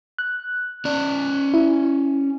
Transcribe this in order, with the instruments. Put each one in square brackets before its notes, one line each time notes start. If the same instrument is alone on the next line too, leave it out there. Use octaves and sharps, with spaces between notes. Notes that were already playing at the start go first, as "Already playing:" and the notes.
[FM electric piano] F#6
[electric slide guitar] C#4 D5
[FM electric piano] E4